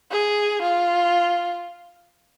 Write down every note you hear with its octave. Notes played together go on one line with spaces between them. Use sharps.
G#4
F4